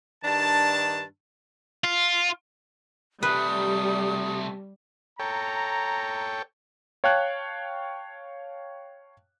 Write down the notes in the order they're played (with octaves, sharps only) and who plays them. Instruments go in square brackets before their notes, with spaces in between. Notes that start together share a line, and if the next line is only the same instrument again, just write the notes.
[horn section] G2 D#3 D4 A5
[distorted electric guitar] F4
[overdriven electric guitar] C3 A3 [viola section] G3 [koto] B4 [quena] D#6
[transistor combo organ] A4 C#5 G5 [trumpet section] A#5
[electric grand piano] C#5 F5 G5 A5 F#6 G#6